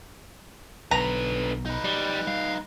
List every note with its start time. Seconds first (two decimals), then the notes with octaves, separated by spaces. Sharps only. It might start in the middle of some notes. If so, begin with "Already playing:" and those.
0.91 B1 D3 B4 A#5
1.66 D#4 B4
1.84 G3
2.27 G3 F5